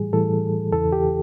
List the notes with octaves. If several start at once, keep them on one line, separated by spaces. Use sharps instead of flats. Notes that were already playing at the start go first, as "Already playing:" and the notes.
Already playing: A2 E3 G3 G#4
A2 E3 G3 A4
E2 C#3 E3 A4
G4